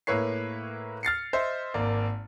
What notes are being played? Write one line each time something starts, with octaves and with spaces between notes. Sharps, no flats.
A2 A#3 E4 B4 C#5 C7
F6 A6 C7 C#7
C5 D#5 E5
G#1 A#3 D5